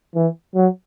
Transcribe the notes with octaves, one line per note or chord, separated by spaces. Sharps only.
E3
F#3